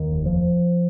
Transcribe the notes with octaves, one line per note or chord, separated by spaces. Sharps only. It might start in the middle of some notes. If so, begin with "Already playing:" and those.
Already playing: D#2 D#3
F1
F3